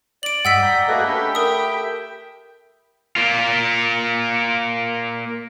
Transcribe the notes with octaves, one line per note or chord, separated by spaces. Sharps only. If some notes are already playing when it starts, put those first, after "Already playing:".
D5 D7 F#7
G2 D#5 F#5 E6 B6
G5 A#5
A3 A#3 F#4 G#4 A#4 B4 D#5
C#4 D4 G4 A4 B5
A#4 E5 G5 D#6
A#3 F4